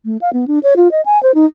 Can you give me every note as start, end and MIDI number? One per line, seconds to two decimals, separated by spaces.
0.05 0.17 57
0.21 0.32 77
0.33 0.45 59
0.48 0.59 62
0.63 0.74 73
0.76 0.91 65
0.91 1.01 75
1.06 1.21 80
1.23 1.32 72
1.35 1.45 63